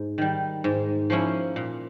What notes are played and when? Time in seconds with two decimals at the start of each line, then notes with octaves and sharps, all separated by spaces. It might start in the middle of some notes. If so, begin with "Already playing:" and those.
Already playing: G#2
0.18 D#3 G3
0.64 G#2
1.10 F3 A#3 C#4 E4
1.56 A#2